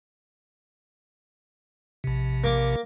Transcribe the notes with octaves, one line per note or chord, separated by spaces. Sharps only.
A#1 C3
A#3 D6